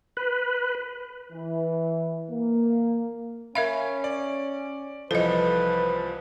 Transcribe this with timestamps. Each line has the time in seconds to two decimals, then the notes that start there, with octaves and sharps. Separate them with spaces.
0.17 B4
1.32 E3
2.31 A#3
3.55 C#4 A#4 E5 F5 B5
4.04 D5
5.11 C2 E3 F3 A4 B4 D#5